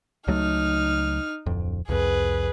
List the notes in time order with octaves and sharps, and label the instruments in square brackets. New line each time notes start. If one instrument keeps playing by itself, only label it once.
[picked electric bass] C#2 F#3 A3 [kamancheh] D#4 F6
[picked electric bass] D1 F2
[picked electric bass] C2 F2 [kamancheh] G#4 B4